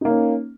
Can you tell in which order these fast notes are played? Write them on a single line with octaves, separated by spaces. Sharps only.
D#4 A#3 C#4